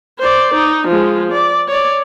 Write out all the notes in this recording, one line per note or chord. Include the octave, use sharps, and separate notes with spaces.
C5 D5
D#4
F3 G#3
D5
C#5 D5